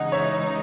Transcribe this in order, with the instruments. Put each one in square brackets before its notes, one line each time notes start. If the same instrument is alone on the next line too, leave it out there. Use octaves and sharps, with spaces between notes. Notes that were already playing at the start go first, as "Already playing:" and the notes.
Already playing: [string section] C#3 E3 G#3 D#4 [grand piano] D#5 F#5
[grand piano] C#5 E5